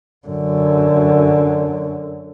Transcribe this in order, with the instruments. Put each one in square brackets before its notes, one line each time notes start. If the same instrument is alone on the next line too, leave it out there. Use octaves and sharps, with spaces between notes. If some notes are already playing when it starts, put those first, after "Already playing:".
[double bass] F#2 D3